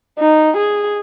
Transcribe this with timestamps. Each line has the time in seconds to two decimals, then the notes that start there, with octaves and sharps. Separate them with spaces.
0.19 D#4
0.57 G#4